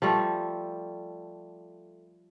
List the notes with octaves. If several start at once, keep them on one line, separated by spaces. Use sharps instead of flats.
F3 G3 A3